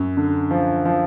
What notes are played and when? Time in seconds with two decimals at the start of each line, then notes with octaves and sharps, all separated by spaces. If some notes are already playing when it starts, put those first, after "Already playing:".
Already playing: F#2
0.17 D3
0.51 F3
0.85 F3